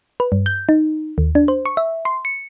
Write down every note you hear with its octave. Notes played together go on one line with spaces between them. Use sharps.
B4
G2
G6
D#4
D#2
D4
C5
C#6
E5
C6
C#7